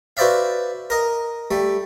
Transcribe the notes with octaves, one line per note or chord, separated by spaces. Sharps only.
F#4 B4 C5 D5 E5 F5
A#4 D#5
G3 A3